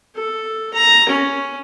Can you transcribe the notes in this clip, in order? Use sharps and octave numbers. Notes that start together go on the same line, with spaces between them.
A4
A#5
C#4